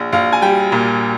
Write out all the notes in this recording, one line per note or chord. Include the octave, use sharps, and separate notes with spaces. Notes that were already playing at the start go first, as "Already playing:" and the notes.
Already playing: A#1
A#1 F5
G#5
G3 G5
A#2